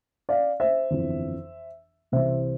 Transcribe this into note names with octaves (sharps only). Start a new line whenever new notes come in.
D5 F5
C5 E5
G1 F2 E3
C2 C3 E3 C5 E5